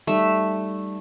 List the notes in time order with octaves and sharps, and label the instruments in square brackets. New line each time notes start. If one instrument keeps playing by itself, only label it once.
[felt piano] G3 D#4 [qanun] A3 E5